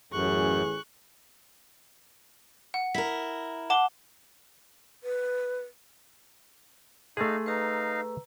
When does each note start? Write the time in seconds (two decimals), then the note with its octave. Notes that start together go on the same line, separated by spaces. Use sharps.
0.12 A1 F#2 G#4 C#6 F#6
2.74 F#5
2.95 E4 A#4 B6
3.70 F#5 A5 D6 G7
5.04 B4
7.17 A3 D#4 G#4 F5 C6
7.46 D#4 B4 F5 A#5 E6